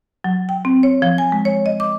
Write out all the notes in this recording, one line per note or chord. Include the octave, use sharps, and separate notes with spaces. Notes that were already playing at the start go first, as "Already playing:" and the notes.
F#3
G5
C4
C#5
F3
G#5
G#3
C#5
D#5
D6